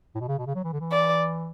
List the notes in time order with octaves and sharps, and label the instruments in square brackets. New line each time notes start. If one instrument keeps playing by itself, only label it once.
[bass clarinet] A2
B2
C#3
B2
C#3
F#3
E3
D3
E3
[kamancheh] D5